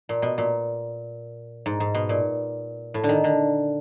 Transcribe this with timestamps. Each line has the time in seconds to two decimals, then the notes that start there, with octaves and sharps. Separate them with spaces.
0.09 A#2
0.22 B2
0.38 A#2
1.66 G#2
1.80 G#2
1.95 B2
2.09 A#2
2.94 A2
3.04 D3
3.09 D#3
3.24 D3